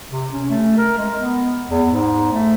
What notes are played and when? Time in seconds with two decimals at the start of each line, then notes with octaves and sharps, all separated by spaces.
0.10 C3
0.32 C#4
0.50 A3
0.78 A#4
0.97 G#3
1.18 B3
1.70 E2
1.88 G#2
2.32 A3